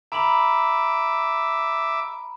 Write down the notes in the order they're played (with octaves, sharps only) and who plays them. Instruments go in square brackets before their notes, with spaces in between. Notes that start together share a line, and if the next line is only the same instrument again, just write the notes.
[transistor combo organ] E5 D6 [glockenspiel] A#5 B5 F#7